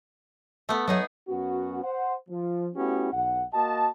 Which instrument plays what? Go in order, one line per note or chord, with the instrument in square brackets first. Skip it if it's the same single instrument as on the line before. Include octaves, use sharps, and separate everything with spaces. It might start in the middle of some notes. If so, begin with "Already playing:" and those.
[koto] A3 B3
[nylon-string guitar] F#3 E5 [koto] B3 D#4 G#4
[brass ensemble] F#2 B3 C#4 F#4
C5 F#5
F3
A3 B3 C#4 E4 F#4 G4
B1 F#5
A#3 F#4 D#5 A5